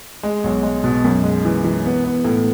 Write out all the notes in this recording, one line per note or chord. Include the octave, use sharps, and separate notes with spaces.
G#3
B1
G#3
B2
F#2
G#3
E3
E3
B3
B3
A2